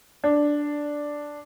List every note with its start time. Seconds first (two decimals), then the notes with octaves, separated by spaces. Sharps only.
0.24 D4